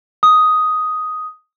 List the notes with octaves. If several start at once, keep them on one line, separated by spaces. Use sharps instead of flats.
D#6